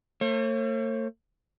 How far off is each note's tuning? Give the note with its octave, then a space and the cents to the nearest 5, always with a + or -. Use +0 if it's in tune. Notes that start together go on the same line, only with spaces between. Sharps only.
A3 +45 C#5 -45